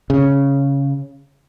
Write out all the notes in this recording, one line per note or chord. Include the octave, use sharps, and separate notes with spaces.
C#3